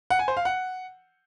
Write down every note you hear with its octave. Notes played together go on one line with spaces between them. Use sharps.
F#5
G#5
C5
F5
F#5